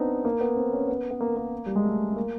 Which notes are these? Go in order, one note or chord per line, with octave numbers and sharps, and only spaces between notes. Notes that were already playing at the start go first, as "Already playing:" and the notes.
Already playing: B3 C4 D4 D#4
A#3
B3
C4
C#4
B3
B3
A#3
A#3
G3
G#3
A3
A3
A#3